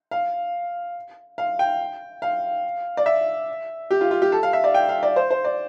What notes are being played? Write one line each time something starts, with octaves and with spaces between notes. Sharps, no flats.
F5
F5
G5
F5
D5
E5
G4
F4
F4
G4
A4
F5
E5
D5
G5
F5
D5
C5
C5
D5